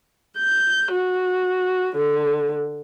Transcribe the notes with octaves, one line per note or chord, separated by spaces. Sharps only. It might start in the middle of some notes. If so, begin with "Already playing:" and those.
G6
F#4
D3